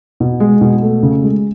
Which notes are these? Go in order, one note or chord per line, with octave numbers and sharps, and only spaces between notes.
B2
G#3
B2
A3
C#3
G#3